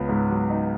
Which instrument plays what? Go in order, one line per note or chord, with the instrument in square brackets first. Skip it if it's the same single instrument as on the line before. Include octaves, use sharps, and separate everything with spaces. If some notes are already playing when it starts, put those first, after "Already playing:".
Already playing: [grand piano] C#2 B3
G#2
F#3
D#4